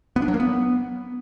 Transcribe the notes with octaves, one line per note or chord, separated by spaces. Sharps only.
B3
D4
F#3
A#3
B3